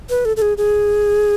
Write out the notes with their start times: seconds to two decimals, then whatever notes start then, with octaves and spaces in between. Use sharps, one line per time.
0.10 B4
0.25 A4
0.37 A4
0.42 G#4
0.58 G#4